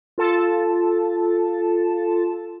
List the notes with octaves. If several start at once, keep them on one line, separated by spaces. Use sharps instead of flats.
F4 A4 A5